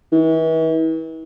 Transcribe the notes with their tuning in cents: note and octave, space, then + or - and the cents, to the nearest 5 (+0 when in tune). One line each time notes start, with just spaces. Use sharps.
E3 -40